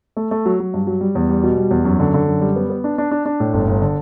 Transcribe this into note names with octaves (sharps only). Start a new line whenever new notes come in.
A3
A3
F#3
F#3
G2
F#3
G3
E2
G3
B2
G3
E2
F#2
D3
D3
F#2
G3
B3
B3
D4
D4
D4
D4
A2
G1
G1
D3